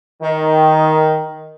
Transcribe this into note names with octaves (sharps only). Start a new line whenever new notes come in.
D#3